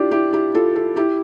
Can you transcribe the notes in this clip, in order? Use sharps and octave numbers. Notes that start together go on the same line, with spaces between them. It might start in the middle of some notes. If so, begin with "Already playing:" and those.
Already playing: D4 E4 F4 G4
E4 G4
E4 G4
F4 A4
F4 A4
E4 G4